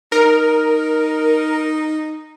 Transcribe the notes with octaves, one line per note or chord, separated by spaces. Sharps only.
D#4 A#4